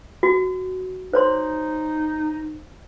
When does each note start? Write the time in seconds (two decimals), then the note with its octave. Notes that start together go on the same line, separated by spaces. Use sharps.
0.23 F#4
1.13 D#4 C5 C#5 C6